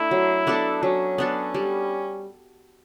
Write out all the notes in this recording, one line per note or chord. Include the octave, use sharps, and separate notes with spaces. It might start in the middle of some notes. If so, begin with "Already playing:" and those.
Already playing: A3 D4 E4
F#3
B3 D4 A4
F#3 C#4
B3 D4 A4
G3